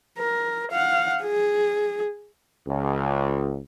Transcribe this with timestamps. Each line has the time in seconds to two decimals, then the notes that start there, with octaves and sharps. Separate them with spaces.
0.19 A#4
0.72 F5 F#5
1.22 G#4
2.67 C#2